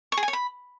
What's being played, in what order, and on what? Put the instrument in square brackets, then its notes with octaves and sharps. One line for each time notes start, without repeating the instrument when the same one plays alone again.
[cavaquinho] C#6
G#4
G#5
C#5
B5